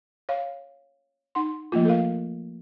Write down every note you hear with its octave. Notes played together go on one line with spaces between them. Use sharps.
C#5 F5
D#4 F#5 C6
F3 A3 A#3 F4
A4 A#4 F5